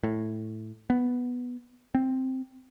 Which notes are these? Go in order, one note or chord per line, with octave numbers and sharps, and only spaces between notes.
A2
B3
C4